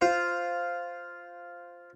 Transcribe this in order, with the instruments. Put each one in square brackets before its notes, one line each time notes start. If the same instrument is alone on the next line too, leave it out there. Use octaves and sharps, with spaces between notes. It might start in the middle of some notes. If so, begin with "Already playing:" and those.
[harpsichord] F4 C5